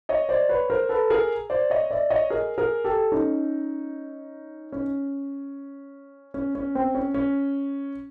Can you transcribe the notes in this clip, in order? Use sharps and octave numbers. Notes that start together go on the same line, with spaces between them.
C#5 D#5
C5 D5
B4 C#5
A#4 C5
A4 B4
G#4 A#4
C5 D5
C#5 D#5
D5 E5
C#5 D#5
G#4 A#4
G#4 A#4
G4 A4
C#4 D#4
C#4
C#4
C#4
C4
C#4
C#4